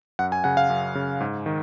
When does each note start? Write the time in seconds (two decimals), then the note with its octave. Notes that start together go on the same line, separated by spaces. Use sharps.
0.19 F#2 F#5
0.32 G#5
0.44 C#3 F#5
0.57 F5
0.70 F#2
0.95 C#3
1.20 G#2
1.46 D#3